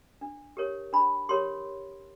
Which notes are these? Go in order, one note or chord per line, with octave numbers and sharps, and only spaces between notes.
D4
G4 A#4 C#5
D4 B5
G4 A#4 C#5 C6